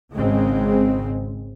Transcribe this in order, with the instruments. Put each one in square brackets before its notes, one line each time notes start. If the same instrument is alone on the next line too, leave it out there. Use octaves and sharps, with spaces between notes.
[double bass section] G#1 C#3 G#3 C4